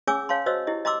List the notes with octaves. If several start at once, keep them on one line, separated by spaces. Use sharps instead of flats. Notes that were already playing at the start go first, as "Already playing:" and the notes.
C#4 G#4 C#5 G#5 D6 E6
C#5 F5 A5 C6
F#4 C5 C#5 D#5 E6
E4 G4 D#5
D#5 A#5 C6 D6 E6